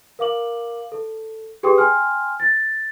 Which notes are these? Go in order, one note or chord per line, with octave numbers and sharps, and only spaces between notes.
A#4 F5 D6 F#7
A4
G4 G#4 B4 G5 C6 D#6
G5 G#5 C6 F6
A6